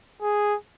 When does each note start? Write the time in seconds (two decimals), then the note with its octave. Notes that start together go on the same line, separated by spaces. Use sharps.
0.22 G#4